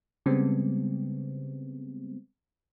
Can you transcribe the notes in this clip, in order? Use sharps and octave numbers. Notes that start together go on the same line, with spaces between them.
C#3 G3 G#3 B3 C4